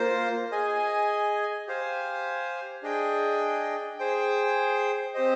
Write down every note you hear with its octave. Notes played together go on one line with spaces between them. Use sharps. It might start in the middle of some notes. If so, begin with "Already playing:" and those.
Already playing: A#3 F4 C5
G#4 D#5 G#5
G4 C5 F5 G#5
D4 G#4 D#5 G5
G#4 C5 G5
C4 G4 C5 D#5